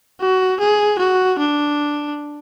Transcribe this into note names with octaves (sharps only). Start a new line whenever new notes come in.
F#4
G#4
F#4
D4